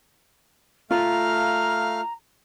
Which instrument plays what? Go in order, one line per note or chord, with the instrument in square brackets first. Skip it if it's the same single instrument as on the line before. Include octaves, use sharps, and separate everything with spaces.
[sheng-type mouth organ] A3 F5 F6 [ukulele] F4 [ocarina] A#5